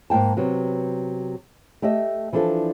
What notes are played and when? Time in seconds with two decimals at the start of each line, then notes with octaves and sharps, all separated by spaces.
0.10 G#2 A#3 G5 A5
0.37 C3 F#3 B3
1.82 A3 G4 D#5 E5
2.33 E3 F3 D4 F4 A4